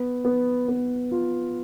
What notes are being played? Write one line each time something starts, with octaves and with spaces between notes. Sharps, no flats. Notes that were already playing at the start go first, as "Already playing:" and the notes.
Already playing: B3
B3
B3
F4